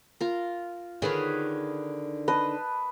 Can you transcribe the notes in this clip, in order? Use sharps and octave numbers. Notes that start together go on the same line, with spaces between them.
F4 A#4
D3 D#3 G#4 B4 C#5
B4 D#5 A5 C6